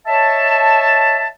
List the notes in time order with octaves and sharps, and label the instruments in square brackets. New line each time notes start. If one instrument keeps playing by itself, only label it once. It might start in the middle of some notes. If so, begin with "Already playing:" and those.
[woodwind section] C#5 D#5 E5 A5